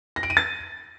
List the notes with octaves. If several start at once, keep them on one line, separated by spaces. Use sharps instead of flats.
A#6
D7
D#7
A6